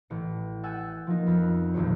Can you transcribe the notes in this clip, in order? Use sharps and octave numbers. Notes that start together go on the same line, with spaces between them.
A1 C#7
F#5 G#5 E6 G6 A6
F3 A#3 D#4
F2 B3
D#1 B1 E2 G2 C5 C#5